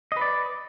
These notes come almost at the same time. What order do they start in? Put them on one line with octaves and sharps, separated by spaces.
D#5 B4 D5